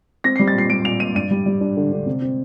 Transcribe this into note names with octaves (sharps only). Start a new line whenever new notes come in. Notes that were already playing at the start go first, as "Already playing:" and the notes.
C4 A#6
G3 C7
A6
A#2 C7
G3 D7
A#2 F7
A#2 D#7
G2 D#7
G3
G3
D4
D3
D3
C3
C4